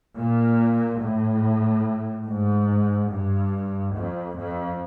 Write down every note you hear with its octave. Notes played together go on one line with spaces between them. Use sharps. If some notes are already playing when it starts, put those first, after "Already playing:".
A#2
A2
G#2
G2
F2
F2